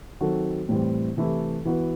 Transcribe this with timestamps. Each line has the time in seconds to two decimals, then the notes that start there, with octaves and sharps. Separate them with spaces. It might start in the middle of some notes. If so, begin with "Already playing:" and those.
0.21 D#3 F#3 C4 F#4 A4
0.69 A2 E3 G3 C4
1.17 C3 E3 A3 E4
1.65 E3 B3 F#4 B4